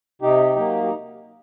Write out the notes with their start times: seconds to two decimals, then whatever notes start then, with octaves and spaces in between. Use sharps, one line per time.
0.22 C3 D#4 G4
0.56 F#3 A#3
0.84 G4